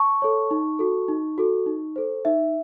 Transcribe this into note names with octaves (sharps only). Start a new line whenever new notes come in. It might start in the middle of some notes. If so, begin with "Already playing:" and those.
Already playing: A5 C#6
A4 C#5
D#4
F#4 A4
D#4
F#4 A4
D#4
A4 C5
D#4 E5